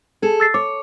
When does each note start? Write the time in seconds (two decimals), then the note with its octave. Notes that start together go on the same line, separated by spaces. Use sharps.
0.22 G#4 A4
0.40 E6 A6 C7
0.54 C#5 D6